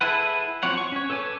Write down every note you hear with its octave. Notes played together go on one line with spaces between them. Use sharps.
E4 G#4 A4 B4 F#5
F3 F#3 C4 C#5 F#5
C#6
C#4 C#5
A4 B4 C#5 G#5 D6